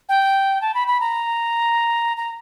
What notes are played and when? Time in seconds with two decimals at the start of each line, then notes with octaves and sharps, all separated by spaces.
0.09 G5
0.61 A5
0.74 B5
0.88 B5
1.00 A#5
2.17 A#5